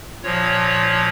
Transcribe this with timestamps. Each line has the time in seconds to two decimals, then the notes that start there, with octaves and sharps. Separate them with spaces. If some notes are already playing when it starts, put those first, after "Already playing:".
0.23 A#2 F3 C#5